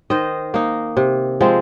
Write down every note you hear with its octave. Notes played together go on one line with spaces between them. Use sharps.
D#3 C5 D#5
A#3 D#4
C3
F3 G#3 C4